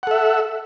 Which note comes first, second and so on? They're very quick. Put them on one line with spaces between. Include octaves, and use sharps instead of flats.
F#5 A4 E5